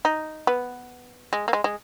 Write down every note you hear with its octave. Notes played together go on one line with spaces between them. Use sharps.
D#4
B3
G#3
A#3
G#3
G#3